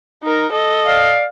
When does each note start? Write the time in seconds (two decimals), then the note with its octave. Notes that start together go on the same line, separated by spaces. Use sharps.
0.23 D#4 A#4
0.53 A4 D#5
0.86 D5 F5